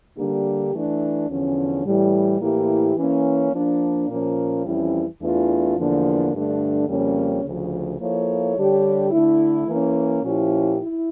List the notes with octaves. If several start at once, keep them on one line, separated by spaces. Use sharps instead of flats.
D3 G3 A#3 D4 G4
E3 A3 D4
E2 D3 F3 C#4
A2 E3 G3
A2 E3 A#3 E4 G4
E3 A#3 C#4
F3 A#3 D4
A#2 F3 A#3 C#4
F2 E3 G3 C#4 E4
E2 E3 A3 D4 F4
E2 D3 F3 A#3 D4
G2 D3 A3 D4
F2 C#3 G3 A#3 C#4
D2 C#3 F3
F3 A#3 E4 A4 C#5
D3 G3 D4 G4 C#5
D3 A3 E4
E3 A#3 C#4
A#2 F3 C#4 E4 G4
E4